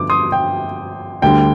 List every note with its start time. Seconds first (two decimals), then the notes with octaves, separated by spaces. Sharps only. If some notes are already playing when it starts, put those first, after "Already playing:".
Already playing: G2 D3 F3 B3 D6
0.10 C6 D#6
0.32 G5
1.22 D2 D3 G3 G5